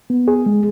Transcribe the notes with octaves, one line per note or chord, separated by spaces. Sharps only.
B3
G#4
G#3